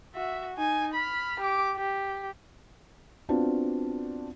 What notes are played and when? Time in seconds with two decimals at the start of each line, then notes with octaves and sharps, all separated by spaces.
0.14 F#4 E5
0.56 D#4 G#5
0.93 B5 F6
1.39 G4 D6
1.75 G4
3.29 B3 C4 D4 F4 F#4